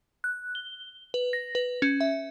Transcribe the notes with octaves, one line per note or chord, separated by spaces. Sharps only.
F#6
G7
B4
A#6
B4
C#4
E5